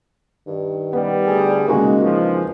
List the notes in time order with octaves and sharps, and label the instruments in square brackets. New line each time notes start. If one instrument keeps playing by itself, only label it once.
[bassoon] G2 [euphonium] D#3
[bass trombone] G3 [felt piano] B3
[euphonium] D2 [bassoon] G#4
[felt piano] C#3 G#3 A#3 [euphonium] D#4 [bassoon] F#4
[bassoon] E2 [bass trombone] F3